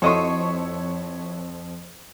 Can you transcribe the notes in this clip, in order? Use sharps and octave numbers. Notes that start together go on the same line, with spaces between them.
F2 E4 F#4 A4 C5 C#5 D#5 C#6